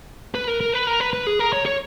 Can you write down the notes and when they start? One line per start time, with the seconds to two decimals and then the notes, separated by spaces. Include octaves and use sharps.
0.35 B4
0.48 A#4
0.61 A#4
0.74 B4
0.87 A#4
1.00 B4
1.13 B4
1.27 G#4
1.39 A#4
1.53 C#5
1.66 C#5